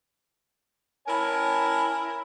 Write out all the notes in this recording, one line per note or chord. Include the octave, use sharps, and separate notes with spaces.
E4 A#4 C#5 G#5 A5